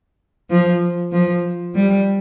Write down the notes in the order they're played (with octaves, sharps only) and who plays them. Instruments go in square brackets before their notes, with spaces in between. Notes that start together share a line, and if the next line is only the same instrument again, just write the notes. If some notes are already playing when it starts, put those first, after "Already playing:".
[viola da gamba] F3
F3
G3